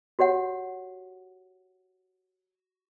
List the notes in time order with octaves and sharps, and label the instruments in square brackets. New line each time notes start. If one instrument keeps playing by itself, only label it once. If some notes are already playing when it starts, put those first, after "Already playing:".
[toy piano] F#4 G4 C#5 F#5